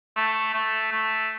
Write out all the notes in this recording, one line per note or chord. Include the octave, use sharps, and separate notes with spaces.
A3
A3
A3